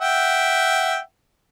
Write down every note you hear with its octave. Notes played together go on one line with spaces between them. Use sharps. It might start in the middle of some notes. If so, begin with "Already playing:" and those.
E5 F#5 G5